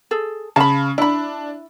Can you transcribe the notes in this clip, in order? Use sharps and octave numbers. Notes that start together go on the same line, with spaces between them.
G#4 A4
C#3 A5 B5
D4 E4 B5